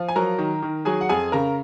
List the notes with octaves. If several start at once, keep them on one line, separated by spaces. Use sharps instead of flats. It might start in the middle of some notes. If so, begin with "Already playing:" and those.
Already playing: F3
G#5
F#3 A#4 A#5
D#3
D#3
F#3 G#4 G#5
F#5
F2 G#4 G#5
C#3 A#4 A#5